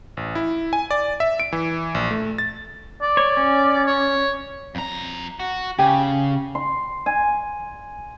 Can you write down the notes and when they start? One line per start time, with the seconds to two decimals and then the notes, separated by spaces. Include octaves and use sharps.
0.17 A1
0.35 E4
0.73 G#5
0.91 D5
1.20 E5
1.40 D7
1.52 E3
1.95 A#1
2.11 A3
2.38 A6
3.02 D5
3.17 C#5
3.37 C#4
3.86 C#5
4.75 F2 A#5
5.40 F#4
5.79 C#3 G4 G#5
6.55 C6
7.06 G#5